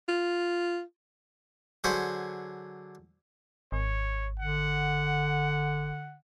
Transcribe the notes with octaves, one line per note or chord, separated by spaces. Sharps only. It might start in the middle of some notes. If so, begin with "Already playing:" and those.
F4
D3 F#3 G#4 C5 B5 C#6
G#1 C#5
D3 F#5